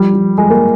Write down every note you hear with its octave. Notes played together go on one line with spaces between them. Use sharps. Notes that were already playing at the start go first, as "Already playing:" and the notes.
Already playing: F3 G3
F3
F3 G#3
A#3